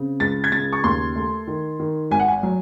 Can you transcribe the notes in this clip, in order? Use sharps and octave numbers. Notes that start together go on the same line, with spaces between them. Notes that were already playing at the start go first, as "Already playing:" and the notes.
Already playing: C#3 C4
C#2 A6
G#6
C#3 A6
C#6
D#2 C6
A3
D#3
D#3
G#1 G#5
F#5
G#5
F#3